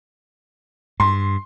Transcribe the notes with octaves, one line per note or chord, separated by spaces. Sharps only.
G2 C6